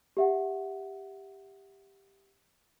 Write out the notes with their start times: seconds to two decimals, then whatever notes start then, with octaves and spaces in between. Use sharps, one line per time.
0.17 G4 E5 F#5